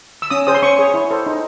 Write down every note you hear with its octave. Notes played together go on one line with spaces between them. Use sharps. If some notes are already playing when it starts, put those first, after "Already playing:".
E6
C#4 D#6
G#4 C5 D#6
C6
C#4 C#6
G#4 C#5
E4
A4 C5
D#4